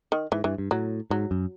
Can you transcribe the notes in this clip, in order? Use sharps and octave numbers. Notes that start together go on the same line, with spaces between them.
D#3
G#2 E3
G2 E3
G2
A2 F#3
G#2 F#3
F#2